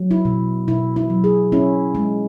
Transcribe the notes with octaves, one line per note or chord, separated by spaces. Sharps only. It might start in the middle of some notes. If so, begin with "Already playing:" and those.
Already playing: F#3
E4
B2
B2 E4
E4
F#3
G#4
C#4 E4
G#3